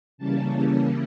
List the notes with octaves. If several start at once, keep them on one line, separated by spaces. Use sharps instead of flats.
C#3 E3 G3 A#3 C#4 A5